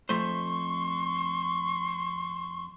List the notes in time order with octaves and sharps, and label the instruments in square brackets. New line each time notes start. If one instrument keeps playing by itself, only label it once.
[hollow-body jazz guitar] F2 A3 C5 [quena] C6 [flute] C#6